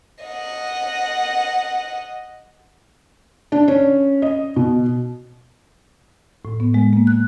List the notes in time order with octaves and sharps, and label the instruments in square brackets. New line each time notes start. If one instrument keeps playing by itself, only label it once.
[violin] D#5 F#5
[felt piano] D4
C#4
D#5
B2
[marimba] A2
B3
G#3
A#3
F#6